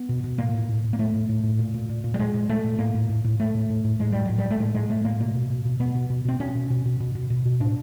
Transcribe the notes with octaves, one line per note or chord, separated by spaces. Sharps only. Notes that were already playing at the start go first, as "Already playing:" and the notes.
Already playing: B3
B2
B2
A2 A#3
A2
A2
A2
A#3
A2 A3
A2
A2
A2
A#2
A#2
A#2
A#2
G3
A#2 G#3
A#2
A#2 A3
A#2
A2 A#3
A2
A2
A2
A2 A3
A2
A2
A2
A2 G#3
A2 G3
A2 F#3
G3
A2
A3
A2 G#3
A2 G#3
A2 A3
A2 A#3
B2 A#3
B2
B2
B2
B2 B3
B2
B2
B2 C4
B2 C#4
B2
B2
B2
B2
B2
B2
B2
A2 D4